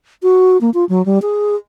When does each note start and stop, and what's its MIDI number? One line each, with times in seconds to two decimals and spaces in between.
0.22 0.57 66
0.61 0.70 58
0.74 0.85 65
0.89 1.04 54
1.06 1.18 55
1.22 1.55 68